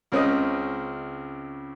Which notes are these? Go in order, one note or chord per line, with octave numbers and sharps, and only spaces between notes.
C#2 C#3 C4 D#5 D#6